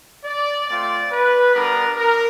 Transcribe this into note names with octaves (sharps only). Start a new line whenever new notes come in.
D5
A3 C4 F4 D5
B4
G3 B3 D4 A#4
A#4